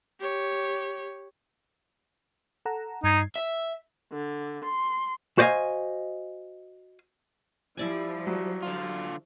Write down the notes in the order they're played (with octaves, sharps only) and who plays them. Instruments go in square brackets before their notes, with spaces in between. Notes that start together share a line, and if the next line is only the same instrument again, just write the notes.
[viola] G4 C#5
[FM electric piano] A4 F#5 A#5
[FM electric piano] G2 G#6 C7 [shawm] D#4
[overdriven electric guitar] E5
[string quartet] D3
C6
[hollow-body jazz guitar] F#4 C5 D5 D#5 F5 G#5
[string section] F3 G3 [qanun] E4 D5 G#5
[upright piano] F#3
[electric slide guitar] D3 F4